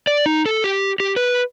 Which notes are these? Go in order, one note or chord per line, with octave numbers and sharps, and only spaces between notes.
D5
D#4
A4
G4
G4
B4